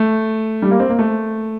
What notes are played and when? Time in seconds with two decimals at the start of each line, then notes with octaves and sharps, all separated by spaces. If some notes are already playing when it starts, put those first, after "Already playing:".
Already playing: A3
0.62 G3
0.71 A#3
0.80 C4
0.89 A#3
0.99 A3